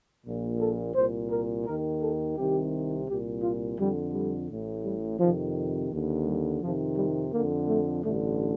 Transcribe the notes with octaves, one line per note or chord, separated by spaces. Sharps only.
A#1 A#2
A4
C2 A#2 C5
A#4
D#2 D#3 A#4
A4
C2 C3 D#3 G4
C2 A#2 G4
F4
F2 D3 G3
G3
A1 A2
G3
F2 C3 D#3 F3
D#2 D3
G3
F2 C3 D#3 F3
G3
F2 D3 A#3
A3
A1 G2 D3 A3